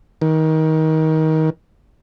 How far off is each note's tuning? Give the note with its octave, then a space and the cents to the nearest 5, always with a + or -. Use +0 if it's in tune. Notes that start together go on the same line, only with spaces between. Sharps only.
D#3 +25